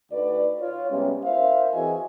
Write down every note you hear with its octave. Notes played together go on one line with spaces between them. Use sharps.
D2 D#4 F#4 B4 D5
F4 C#5
C3 G3 G#3 B3 C#4
E4 A#4 C5 E5 F5
E3 C4 F#4 G#4 D#5 G#5